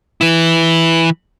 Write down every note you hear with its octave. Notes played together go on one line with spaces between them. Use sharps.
E3 E4